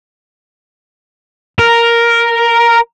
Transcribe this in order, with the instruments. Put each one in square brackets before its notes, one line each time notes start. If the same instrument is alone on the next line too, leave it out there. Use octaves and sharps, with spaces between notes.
[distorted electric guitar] A#4